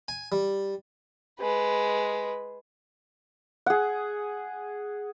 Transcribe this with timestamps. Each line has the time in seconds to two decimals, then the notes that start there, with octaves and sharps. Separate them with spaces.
0.08 G#5
0.32 G3
1.40 G#3 B4
3.66 G#4 F#5